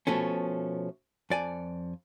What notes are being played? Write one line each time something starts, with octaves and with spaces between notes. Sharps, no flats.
B2 F3 A3 C#4
F2 D5 G#5